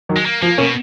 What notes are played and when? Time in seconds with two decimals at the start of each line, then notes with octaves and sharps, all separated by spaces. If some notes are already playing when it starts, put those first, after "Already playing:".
0.09 D#3 F#3
0.16 G#3
0.26 A#3
0.42 F3 A#3
0.58 B2 A#3 C#4